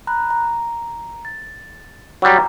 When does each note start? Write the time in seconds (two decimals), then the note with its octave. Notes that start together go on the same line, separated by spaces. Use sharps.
0.07 A#5 B5 F#6
0.31 A#5
1.25 A6
2.22 F#3 G3 G5 A#5